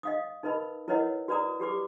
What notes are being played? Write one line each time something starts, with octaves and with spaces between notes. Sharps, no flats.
D#5 F5 D#6
D#4 A#4 B4 D#5 B5
E4 A#4 B4 C#5 D#5 F#5
F#4 B4 D5 A#5 D#6
F#4 G4 B4 D6